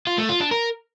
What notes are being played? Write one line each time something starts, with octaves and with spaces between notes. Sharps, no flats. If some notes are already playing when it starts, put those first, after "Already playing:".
F4
A3
F4
D4
A#4